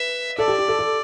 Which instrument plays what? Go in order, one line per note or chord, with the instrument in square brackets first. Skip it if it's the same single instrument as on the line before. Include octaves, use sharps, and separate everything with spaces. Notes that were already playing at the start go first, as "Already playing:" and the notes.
Already playing: [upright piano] B4 [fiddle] E5
[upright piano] A4 [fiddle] D5
[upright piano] G4
G4
A4
A4